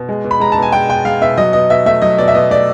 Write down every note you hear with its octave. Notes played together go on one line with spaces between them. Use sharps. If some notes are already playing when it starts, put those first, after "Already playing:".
Already playing: B2
G#3
B2
B5
G#3 A#5
A5
B2
G#5
G#3 G5
B2 G5
G#3 F5
B2 E5
F#3 D#5
B2 D#5
B2 E5
A3 E5
F#3 D#5
B2 D5
E5
B2 D#5
A3 D5